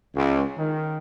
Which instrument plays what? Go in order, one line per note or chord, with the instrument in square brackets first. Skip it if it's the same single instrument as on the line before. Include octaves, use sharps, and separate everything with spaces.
[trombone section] C#2
D#3